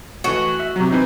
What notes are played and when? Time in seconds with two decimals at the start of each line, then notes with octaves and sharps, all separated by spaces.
0.24 E3 A3 F#4 D#5
0.60 E5
0.76 C3 F#3
0.91 E3 C4 D#4